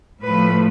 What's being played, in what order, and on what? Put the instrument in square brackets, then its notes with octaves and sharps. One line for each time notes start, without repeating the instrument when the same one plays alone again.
[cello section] A2 F3 A3 B4